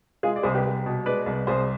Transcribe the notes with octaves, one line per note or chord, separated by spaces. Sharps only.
G#3 F4 G#4
D5
C2 G#4 C5
G4 B4
C2
B2
G#3 B4 D5
C2
C2 G#4 C5